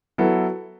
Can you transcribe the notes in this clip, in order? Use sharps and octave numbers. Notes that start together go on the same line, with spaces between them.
F#3 B3 E4 A4